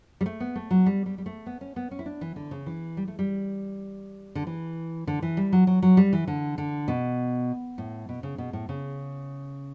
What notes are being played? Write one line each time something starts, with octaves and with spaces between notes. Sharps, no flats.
G3
A3
B3
A3
F#3
G3
G3
G3
A3
B3
C#4
B3
C#4
E4
D4
E3
D3
C#3
E3
G3
A3
G3
D3
E3
D3
E3
G3
F#3
F#3
F#3
G3
E3
D3
D3
B2
A2
B2
C#3
B2
A2
C#3